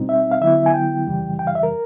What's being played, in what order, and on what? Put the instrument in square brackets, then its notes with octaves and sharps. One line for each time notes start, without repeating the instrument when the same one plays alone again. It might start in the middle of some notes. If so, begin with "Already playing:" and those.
Already playing: [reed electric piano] B2 G3 C4 D#4
E5
F5
D3 F#3 B3 E4 E5
G#5
G5
F2 C#3 E3 G3
G5
F5
E5
A#4